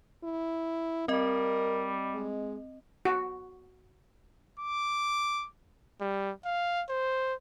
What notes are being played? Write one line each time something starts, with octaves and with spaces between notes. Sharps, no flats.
E4
G3 C4 A#4 D#5
G#3
F#4
D6
G3
F5
C5